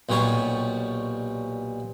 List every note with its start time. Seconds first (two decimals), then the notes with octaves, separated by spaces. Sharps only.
0.09 B1 A#2 G3 C#5 C#6